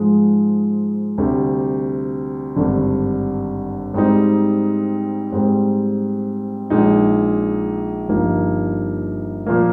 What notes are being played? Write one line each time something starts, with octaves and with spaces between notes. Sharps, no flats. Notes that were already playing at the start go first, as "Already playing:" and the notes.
Already playing: G#2 F3 G#3
D2 C3 G3
G#1 G2 D3
G#2 G3 C4 D#4
G#2 G3 C4
A#1 A#2 G#3 D#4
G1 G2 F3 A#3 D#4
A#2 F3 A#3